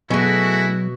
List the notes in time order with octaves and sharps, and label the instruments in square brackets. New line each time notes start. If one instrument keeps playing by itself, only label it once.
[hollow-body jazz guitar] B2 [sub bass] F#3 [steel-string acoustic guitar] A3 G#4 [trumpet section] E4 F#4